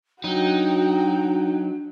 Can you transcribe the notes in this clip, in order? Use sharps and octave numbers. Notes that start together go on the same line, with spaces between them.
F#3 D4 D#4 F#4 G5